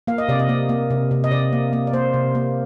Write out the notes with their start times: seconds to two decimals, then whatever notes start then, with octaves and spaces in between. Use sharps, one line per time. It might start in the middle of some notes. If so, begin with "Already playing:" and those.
0.07 A#3 F5
0.18 D#5
0.29 C3 D5
0.39 D#5
0.49 A#3
0.69 A#3
0.90 C3
1.11 C3
1.24 D#5
1.31 C3 D5
1.53 A#3
1.73 A#3
1.87 D5
1.93 A#3 C5
2.14 C3
2.35 A#3